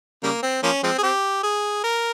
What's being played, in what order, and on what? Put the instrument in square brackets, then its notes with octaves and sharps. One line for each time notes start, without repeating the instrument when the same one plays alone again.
[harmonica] C#3 G3 A#3
C4
F3 A#3 C#4
F3 G#3 C4
G#4
C4 G4
G#4
A#4